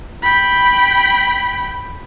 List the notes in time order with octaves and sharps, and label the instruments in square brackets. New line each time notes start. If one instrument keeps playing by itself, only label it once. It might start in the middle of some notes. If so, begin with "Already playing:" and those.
[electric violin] G5 B5